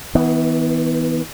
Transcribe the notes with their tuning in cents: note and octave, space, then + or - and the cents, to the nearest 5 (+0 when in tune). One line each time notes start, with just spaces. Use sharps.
E3 -35 B3 +10